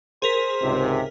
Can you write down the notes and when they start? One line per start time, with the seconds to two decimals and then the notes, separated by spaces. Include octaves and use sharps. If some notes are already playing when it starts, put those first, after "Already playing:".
0.22 G#4 A#4 C5 B6
0.62 C#2 G#2 C3